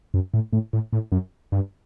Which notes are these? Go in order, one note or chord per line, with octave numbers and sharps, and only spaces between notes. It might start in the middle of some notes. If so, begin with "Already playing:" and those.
F#2
A2
A2
A2
A2
F#2
G2